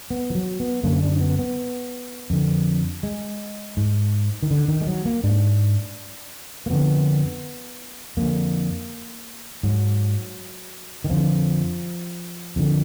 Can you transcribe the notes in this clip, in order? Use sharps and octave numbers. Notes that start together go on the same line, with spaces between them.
B3
F3
F#3
B3
F#2 D3 A#3
D4
D4
B3
B3
F2 D3
G#3
G#2
D#3
D3
D#3
G#3
F#3
A#3
G#2 D4
A#3
F2 D3 B3
F2 D3 A#3
G#2 F#3
D#3
F2 D3 F3
F2 D3